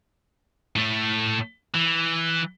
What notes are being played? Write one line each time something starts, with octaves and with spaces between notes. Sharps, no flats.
A2 A3
E3